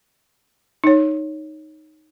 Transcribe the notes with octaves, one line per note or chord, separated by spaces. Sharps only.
D#4 C#5